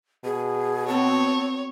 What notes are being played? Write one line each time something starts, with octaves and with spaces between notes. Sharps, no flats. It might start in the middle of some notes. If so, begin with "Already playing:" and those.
B2 G#4
B3 C4 F#4 C#5 A5